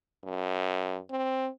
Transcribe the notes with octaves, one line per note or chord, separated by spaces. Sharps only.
F#2
C4